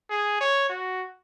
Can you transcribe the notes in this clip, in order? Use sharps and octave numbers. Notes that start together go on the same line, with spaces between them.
G#4
C#5
F#4